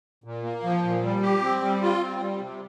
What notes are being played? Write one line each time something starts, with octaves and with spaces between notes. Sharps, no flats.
A#2
A#3
F3
A#2
G3
G4
C4
G3
F4
C4
G3
C3